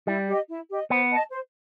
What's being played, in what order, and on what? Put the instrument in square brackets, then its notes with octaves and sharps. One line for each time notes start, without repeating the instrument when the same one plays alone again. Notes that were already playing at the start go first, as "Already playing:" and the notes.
[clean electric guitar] G3 [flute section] E4
[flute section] G4 D#5
E4
G4 D#5
[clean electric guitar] B3 [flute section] C5
[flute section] D#5 A5
C5